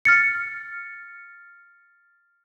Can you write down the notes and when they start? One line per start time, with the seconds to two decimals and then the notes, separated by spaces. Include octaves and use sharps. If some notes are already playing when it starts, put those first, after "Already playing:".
0.05 F6 A6 C#7